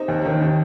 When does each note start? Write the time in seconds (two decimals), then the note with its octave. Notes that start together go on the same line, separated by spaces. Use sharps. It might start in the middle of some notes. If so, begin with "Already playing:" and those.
Already playing: C3 D#4
0.08 D#2
0.25 D#3
0.41 D#3